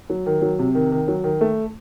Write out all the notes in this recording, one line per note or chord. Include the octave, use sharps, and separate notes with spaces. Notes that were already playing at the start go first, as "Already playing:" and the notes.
F#3
D#3
F#3
C3
D#3
D#3
F#3
D#3
A3